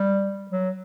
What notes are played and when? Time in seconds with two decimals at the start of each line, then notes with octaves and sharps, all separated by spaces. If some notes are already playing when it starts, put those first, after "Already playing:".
Already playing: G3
0.51 F#3